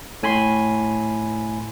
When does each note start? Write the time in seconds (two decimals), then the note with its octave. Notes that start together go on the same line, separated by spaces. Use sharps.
0.23 A2 G#5 B5 C6